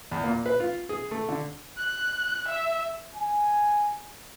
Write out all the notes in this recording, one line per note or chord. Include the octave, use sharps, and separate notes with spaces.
E2
A#2
B4
F4
G#4
A3
D3
F#6
E5
G#5